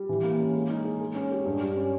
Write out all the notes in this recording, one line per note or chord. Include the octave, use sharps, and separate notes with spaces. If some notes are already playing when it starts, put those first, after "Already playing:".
Already playing: G3
E3
A#3
C#4
G#3
D#4
G#4
G#3
C#4
G4
G2
G3
C#4